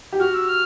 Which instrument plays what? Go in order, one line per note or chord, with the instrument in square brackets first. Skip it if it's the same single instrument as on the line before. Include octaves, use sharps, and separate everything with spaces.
[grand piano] G4
[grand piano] F#4 [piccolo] F6
[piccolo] E6
F6